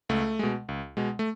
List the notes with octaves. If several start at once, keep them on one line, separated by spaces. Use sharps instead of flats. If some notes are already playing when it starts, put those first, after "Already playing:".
C#2 A3
B2 G#3
C#2
B2 G#3
A3